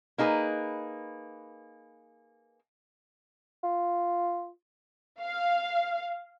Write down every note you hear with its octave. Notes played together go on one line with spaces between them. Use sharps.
A#3 D#4 G#4 B4
F4
F5